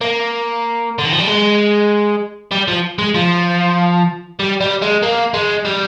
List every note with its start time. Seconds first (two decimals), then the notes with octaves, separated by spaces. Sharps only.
0.01 A#3
0.98 D3
1.05 D#3
1.12 F3
1.19 G3
1.27 G#3
2.51 G3
2.68 F3
2.98 G#3
3.14 F3
4.40 G3
4.60 G3
4.82 G#3
5.02 A#3
5.34 G#3
5.65 G3